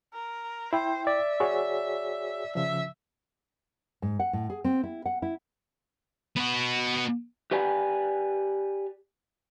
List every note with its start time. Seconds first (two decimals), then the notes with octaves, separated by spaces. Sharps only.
0.13 A#4
0.73 E4 C5 G5
1.07 D5 E5
1.40 F#4 G#4 C#5
2.55 C#3 F3 E5
4.02 G#2
4.20 F#5
4.33 A2
4.50 G#4
4.64 C4
4.83 E4
5.06 F#5
5.22 E4
6.36 B3 F#4
7.51 G4 B4 D5 G#5